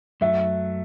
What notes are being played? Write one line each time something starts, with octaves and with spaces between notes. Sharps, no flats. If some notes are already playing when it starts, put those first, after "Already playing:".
F#2 F#3 A3 E5